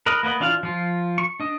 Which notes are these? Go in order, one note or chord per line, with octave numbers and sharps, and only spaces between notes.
A#4 B4 D#5
A#3 B3 B4 D#5
E3 D4 F4 F5
F3 F4
C#6
D4 D#5